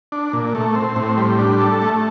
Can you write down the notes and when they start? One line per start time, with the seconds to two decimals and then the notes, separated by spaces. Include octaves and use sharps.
0.12 D4
0.33 A#2
0.55 A3
0.75 C4
0.96 A2
1.18 G3
1.39 D4
1.60 A4
1.82 A3